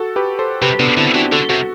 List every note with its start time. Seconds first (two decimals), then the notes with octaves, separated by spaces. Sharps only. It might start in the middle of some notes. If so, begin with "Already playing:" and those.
Already playing: F#4 A4
0.16 G4 B4
0.39 A4 C5
0.62 C3 G4 B4
0.80 C3 B3 D4
0.97 D3 C4 E4
1.15 E3 D4 F#4
1.32 D3 F#4 A4
1.49 C3 F#4 A4